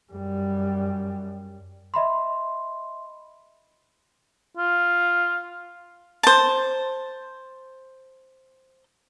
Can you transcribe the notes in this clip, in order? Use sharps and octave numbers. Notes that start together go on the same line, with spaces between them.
F#2 G3
D#5 E5 B5 C6
F4
C5 A5